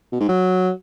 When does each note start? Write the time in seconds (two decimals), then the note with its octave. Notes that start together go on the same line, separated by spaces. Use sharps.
0.12 B2
0.20 G#2
0.29 F#3